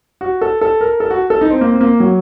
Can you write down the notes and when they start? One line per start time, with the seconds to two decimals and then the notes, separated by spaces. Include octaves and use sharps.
0.21 F#4
0.41 A4
0.61 A4
0.81 A#4
1.00 A4
1.10 F#4
1.30 A4
1.41 D#4
1.50 C4
1.61 A#3
1.71 C4
1.81 A#3
2.00 F#3